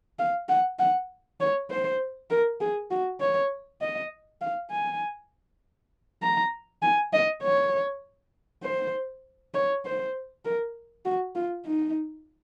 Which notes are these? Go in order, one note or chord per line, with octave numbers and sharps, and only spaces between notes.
F5
F#5
F#5
C#5
C5
A#4
G#4
F#4
C#5
D#5
F5
G#5
A#5
G#5
D#5
C#5
C5
C#5
C5
A#4
F#4
F4
D#4